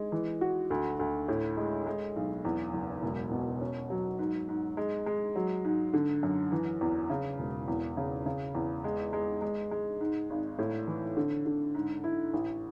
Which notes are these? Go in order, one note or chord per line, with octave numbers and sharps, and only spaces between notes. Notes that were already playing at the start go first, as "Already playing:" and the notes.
Already playing: G#3
E3
F#4
D2
D2
A2
G#3
G#3
B1
E2
F#1
E1
B2
C#4
F#3
G#2
G#2
G#3
G#3
F#3
G#2
D3
F#2
E3
E2
C#3
E1
E2
C#3
C#3
E2
G#3
G#3
G#3
G#3
G#2
G#1
A2
E3
D3
D3
G#2
E4
A1